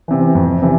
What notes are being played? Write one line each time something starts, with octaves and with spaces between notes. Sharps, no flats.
C3 E3
F2
C3 E3